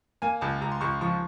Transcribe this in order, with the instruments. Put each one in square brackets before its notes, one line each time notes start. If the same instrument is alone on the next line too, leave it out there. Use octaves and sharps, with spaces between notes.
[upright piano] A#3 [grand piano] G#5
[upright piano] C#2 [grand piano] A5
[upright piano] C#2 [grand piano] A#5
[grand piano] C6
[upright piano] C#2 [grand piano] C#6
[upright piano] F3 [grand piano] C#6